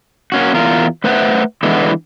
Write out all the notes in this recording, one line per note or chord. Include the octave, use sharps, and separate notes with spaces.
A#3 C#4 F#4
E2 F4 A#4
A3 B4 C5 E5 F#5
D3 E3 G#3 B3 E4